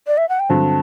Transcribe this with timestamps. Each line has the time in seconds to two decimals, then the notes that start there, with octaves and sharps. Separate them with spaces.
0.07 D5
0.18 E5
0.29 F#5
0.39 G5
0.49 G2 D3 F#3 C4 A5